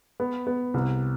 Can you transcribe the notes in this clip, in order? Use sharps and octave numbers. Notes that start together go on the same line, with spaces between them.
B3
B3
C2